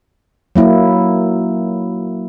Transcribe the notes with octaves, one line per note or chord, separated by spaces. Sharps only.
F#3 A#3 E4